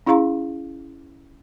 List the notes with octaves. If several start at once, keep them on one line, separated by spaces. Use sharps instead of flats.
C#4 E4 G#4 F5 A#5 C6